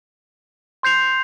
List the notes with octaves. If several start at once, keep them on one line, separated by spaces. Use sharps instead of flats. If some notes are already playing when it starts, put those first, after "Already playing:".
C6 G6 C7 F7